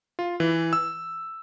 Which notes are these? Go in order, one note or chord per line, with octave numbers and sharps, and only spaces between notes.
F4
E3
E6